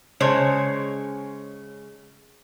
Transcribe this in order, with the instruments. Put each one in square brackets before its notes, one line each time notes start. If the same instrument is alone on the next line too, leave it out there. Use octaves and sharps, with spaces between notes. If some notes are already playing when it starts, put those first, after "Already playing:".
[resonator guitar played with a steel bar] C#3 G#3 C5 C#5